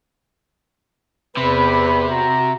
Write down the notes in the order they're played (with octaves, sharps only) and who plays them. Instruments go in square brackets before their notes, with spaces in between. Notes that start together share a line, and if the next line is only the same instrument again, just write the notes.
[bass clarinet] E2 [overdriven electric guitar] C3 [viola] B4 [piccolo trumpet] B5
[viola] F#4 [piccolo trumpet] A#5